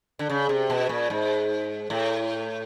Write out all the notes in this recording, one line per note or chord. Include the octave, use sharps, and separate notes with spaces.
D3
C#3
C3
B2
A#2
G#2
A2